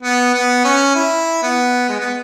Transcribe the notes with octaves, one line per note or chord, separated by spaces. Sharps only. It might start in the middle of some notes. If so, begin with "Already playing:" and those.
B3
B3
C#4
E4
B3
G#3
B3